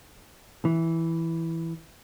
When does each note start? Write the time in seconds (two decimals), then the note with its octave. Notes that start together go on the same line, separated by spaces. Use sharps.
0.65 E3